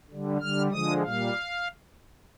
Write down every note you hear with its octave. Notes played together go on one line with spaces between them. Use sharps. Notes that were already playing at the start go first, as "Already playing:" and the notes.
D3 G3
D3 G3 F6
D3 F3 G#3 D#6
A#2 G3 F5